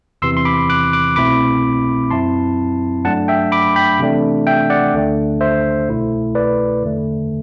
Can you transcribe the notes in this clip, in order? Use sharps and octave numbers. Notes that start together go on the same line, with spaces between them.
E2 C3 E3 C6 E6
C6
B5 D6
D6 F#6
D6 F#6
C2 B2 A3 C4 E4 B5 D6
F#2 F#3 C4 E4 A5 C6
G2 F#3 A3 D4 F#5 A5
E5 G5
B5 D6
G5 B5
C3 E3 A3 D4
E5 G5
D5 F#5
D2 D3 A3 D4
C5 E5
C2 B2 A3 E4
B4 D5
E2 D3 A3